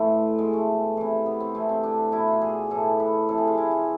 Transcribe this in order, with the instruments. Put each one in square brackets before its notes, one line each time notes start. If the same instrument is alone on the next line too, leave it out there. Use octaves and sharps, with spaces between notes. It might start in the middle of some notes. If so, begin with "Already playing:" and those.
Already playing: [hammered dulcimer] A2 E3 A3 C4
B2 G#3
A3
C3 E3
B3
C4
C3 E3 A3
C4
D4
B2 E4
F4
G#4
A2 E3 A4
B4
C3 E3 A4
G#4
F4
E4
F4